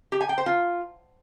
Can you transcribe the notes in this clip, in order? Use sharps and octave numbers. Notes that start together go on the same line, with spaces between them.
G4
G#5
G5
C5
F4